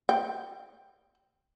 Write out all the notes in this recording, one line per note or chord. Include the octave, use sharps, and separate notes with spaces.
G5